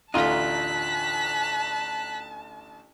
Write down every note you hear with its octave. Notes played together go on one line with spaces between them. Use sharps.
A1 D2 D#4 F4 A5 F#6 B6